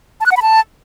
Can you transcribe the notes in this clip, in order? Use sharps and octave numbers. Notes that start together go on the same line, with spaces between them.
A5
F#6
F#5
B5
A5